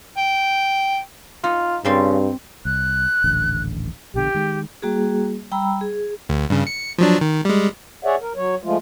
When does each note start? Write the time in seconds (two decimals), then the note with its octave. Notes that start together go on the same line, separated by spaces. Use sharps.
0.18 G5
1.44 D#4 F4
1.85 G2 C#3 G3 C4 D5
2.65 C2 F#6
3.24 D#1 A1 D3
4.14 A#1 B2 D3 G4
4.34 D#3 G#3
4.82 G3 A#3 F#4 G#4
5.51 G3 G5 A#5 B5 E6
5.81 G#4
6.29 D2
6.50 G2 C#3
6.67 C#7
6.98 F3 F#3 D4
7.21 D#3
7.45 G3 G#3
8.05 G#4 C#5 D5 E5 F#5
8.22 A#4
8.36 F#3 C#5
8.63 F3 G#3 A3 F4